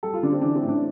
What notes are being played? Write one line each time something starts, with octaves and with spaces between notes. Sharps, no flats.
G3 A4
F4
D3 D4
C4
E3 D4
C4
A2
D4